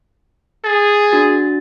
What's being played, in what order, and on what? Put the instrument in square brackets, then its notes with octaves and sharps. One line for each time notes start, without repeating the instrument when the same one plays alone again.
[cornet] G#4 [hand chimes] A6
[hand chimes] D4 F#4 A6